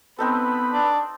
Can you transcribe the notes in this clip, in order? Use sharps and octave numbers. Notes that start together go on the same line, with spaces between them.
B3 C4 D#4 A4 B4 B5
D4